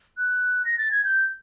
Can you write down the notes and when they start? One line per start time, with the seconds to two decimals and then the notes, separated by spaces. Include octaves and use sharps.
0.17 F#6
0.65 A#6
0.78 A6
0.91 G#6
1.04 G6